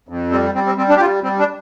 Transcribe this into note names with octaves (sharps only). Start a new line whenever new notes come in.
F2
G3 C4
G3 C4
C4
G3 C4
D4
G4
G3 F4
G3 C4
D4